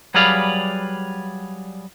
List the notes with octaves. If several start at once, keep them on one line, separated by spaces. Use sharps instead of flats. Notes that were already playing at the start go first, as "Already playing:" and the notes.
F#3 G3 G#4 B4 D5 F5